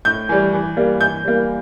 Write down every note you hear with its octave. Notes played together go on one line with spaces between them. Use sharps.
A2 G6
E3 G3
E3
G3 A#3
E3 G6
G3 A#3